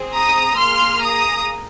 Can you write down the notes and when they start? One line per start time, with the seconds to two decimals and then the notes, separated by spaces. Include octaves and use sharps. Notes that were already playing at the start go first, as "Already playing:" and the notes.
Already playing: C4 G#4
0.13 A#5 D#6
0.56 A#3 G#4 C6 F6
1.00 A#5 D#6